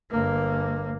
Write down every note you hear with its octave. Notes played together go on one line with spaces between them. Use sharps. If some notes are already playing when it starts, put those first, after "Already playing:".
G1 A#3